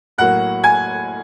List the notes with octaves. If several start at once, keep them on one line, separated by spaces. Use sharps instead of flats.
A2 F#3 A#3 F#5 F#6
G#5 G#6